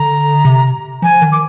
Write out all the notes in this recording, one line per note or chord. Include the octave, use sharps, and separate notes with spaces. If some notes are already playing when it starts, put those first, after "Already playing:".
Already playing: D3 A#5
C3
F3 G#5
D#3
D6